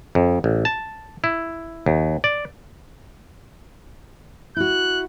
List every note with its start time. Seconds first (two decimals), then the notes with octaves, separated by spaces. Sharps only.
0.15 F2
0.44 A1
0.65 A5
1.24 E4
1.86 D#2
2.24 D5
4.56 E4 F#4 F#6